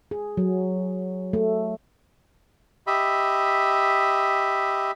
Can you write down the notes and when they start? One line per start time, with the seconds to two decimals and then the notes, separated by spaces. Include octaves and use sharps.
0.11 G#4
0.37 F#3
1.33 A3
2.87 G4 D#5 E5 B5